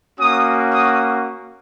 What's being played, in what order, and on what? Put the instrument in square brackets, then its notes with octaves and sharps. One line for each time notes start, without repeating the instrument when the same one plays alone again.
[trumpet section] A#3 C#4 F#4 D#6
D#6